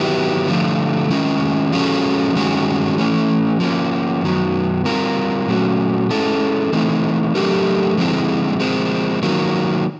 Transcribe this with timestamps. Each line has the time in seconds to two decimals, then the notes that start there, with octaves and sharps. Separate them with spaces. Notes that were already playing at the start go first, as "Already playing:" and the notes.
Already playing: D#3 F#3 B3 E4 G4
0.47 D3 F3 A3
1.10 D#3 G#3 C#4 F4
1.72 F3 G#3 C#4 F#4 A4
2.35 G2 D#3 G#3 C#4 F#4
2.97 E3 A3 C#4
3.60 F3 A#3 C#4
4.22 F#2 D#3 F#3 B3
4.85 G3 C4 F4 A#4
5.48 A#2 F#3 A3 C#4 F#4
6.10 G#3 C#4 E4 A4
6.72 E3 A3 C4 D#4
7.35 F#3 A3 D4 G4 A#4
7.97 D3 F3 G#3 C4 E4
8.60 F3 G#3 C4
9.23 D#3 F#3 A#3